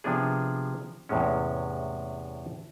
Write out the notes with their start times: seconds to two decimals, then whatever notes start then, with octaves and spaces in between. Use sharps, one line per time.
0.04 C3 F3 B3 D4 G#4
1.09 E2 A2 C3 G#3 C#4